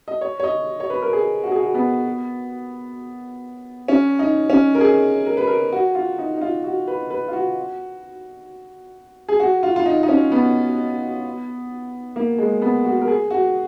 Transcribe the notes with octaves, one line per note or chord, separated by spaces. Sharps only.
D#5
C#5
C#5
D#5
C#5
B4
A#4
G#4
F#4
G#4
F#4
B3
C#4
D#4
C#4
A#4
G#4
A#4
B4
A#4
F#4
F4
D#4
D#4
F4
F#4
B4
B4
F4
F#4
G#4
F#4
F4
F4
D#4
D#4
C#4
B3
A#3
G#3
B3
F#4
A#4
G#4
F#4